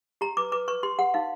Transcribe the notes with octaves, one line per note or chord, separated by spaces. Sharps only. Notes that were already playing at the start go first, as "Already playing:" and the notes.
G4 A#5
B4 D6
B4 D6
B4 C#6
G4 C6
G4 F#5
D#4 F5